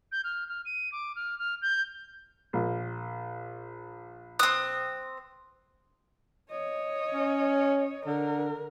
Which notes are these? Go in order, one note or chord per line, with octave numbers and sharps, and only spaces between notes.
G6
F6
F6
D#7
D6
F6
F6
G6
A#1
C4 D#6 F#6
C#5 D#5
C#4
D3 A#4